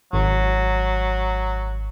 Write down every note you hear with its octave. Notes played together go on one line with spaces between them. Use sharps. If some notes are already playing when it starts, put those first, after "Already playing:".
G#1 F#3